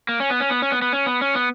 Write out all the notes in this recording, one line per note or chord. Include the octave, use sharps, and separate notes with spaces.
A#3
C#4
B3
C#4
B3
C#4
B3
B3
C#4
B3
C#4
B3